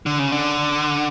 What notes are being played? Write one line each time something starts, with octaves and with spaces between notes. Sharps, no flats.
D3
C#3
D3